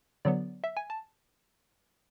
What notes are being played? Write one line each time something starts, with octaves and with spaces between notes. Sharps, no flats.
D3 F#3 B3 D5
E5
G#5
A5